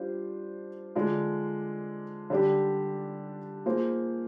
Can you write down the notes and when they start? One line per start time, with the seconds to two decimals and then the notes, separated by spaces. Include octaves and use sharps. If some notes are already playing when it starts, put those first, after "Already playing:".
Already playing: G3 D4 F4 C5
0.95 D3 G#3 D4 F4
2.30 D3 G3 D4 G4
3.66 A#3 F4 G#4 C5